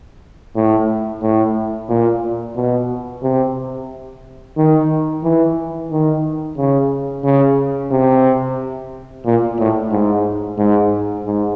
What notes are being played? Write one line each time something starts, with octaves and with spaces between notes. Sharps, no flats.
A2
A2
A#2
B2
C3
D#3
E3
D#3
C#3
C#3
C3
A#2
A2
G#2
G#2
G#2